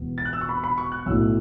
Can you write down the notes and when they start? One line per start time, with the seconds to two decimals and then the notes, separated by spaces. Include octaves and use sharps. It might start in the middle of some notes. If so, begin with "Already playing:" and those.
Already playing: E1 E2 B2 B3
0.18 A6
0.25 F#6
0.33 E6
0.41 C#6
0.49 B5
0.64 B5
0.78 C#6
0.92 F#6
1.06 B1 A2 F#3 A3 E4 E6